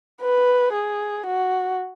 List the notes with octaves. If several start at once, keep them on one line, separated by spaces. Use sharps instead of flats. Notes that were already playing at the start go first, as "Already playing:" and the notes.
B4
G#4
F#4